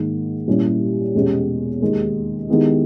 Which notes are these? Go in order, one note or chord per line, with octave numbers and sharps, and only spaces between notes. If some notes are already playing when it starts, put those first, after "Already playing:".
Already playing: G#2 D#3 A#3
A#2 G3 C#4 E4 G4
E2 B2 G#3 C#4 G4
D#2 D#3 G#3
D#3 G#3 B3 E4 G4